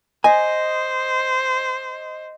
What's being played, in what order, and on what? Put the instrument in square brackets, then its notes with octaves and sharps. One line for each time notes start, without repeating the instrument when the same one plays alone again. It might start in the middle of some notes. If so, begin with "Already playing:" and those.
[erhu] C5 [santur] D#5 [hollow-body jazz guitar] G#5